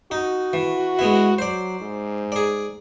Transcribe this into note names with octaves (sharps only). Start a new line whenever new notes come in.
D#4 F#4
E3
G#3 B3 E4
F#3 C5 D5
G#2
G#4 D5